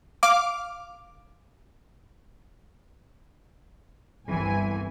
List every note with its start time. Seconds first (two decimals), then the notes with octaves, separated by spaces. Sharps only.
0.23 F5 D6
4.28 G1 C2 E3 G#5